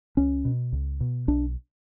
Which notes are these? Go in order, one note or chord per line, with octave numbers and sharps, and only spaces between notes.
C#2 C#4
B2
C#2
B2
B1 D4